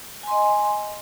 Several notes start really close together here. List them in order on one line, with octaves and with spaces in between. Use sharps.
G#5 C6 D#5